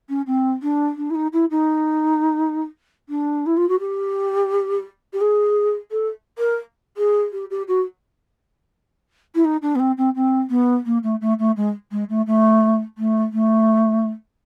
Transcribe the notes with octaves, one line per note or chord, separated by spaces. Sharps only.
C#4
C4
D4
D4
E4
D#4
E4
D#4
D4
E4
F4
F#4
G4
G4
G#4
A4
A#4
G#4
G4
G4
F#4
E4
D#4
D4
B3
C4
C4
C4
B3
A#3
A3
A3
A3
G#3
G#3
A3
A3
A3
A3